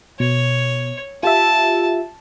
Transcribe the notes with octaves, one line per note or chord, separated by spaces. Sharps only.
B2 C#5
F4 G4 E5 A5